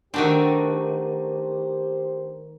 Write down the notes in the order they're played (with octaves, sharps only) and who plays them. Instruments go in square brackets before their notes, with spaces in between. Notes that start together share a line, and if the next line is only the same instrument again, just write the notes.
[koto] D#3 A3 C4 [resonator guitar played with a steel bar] D4 F#4 [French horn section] G4 C5